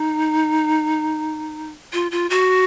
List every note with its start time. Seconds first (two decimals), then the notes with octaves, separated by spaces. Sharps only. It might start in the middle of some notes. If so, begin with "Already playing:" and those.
Already playing: D#4
1.93 F4
2.11 F4
2.30 F#4